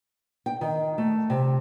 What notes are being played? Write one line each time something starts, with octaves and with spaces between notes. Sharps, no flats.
G5
D#3
A3
C3